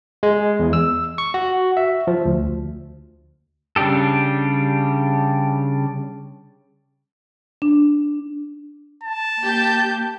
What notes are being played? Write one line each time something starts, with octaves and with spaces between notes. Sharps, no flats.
G#3
E2
E6
C#6
F#4
E5
F3
D2
C#3 G3 D4 G4 A4
D4
A5
A#3 G4 G6